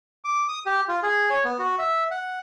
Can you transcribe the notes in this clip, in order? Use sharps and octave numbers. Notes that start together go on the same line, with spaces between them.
D6
D#6
G4
F4
G#4
C#5
B3
F#4
E5
F#5